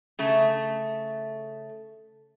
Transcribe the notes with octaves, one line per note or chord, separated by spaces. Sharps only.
C#3 A3